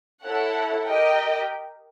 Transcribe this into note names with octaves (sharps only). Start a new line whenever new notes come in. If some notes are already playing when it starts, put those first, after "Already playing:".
E4 A4 C#5 F#5
G4 A#4 D#5 G5